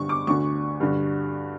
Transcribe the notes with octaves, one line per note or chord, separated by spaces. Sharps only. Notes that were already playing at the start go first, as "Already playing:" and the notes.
Already playing: G2 D3 C#6
D6
D2 D3 C#6
G2 D3